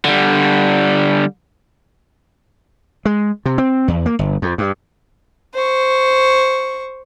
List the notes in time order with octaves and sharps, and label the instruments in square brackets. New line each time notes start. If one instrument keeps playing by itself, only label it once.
[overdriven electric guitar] D3 G3
[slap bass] G#3
C3
C4
E2
A#3
G1
F2
G2
[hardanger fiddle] C5 C#6